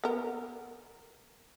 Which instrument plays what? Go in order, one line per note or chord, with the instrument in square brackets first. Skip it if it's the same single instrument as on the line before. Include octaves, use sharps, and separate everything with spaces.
[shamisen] B3 A#4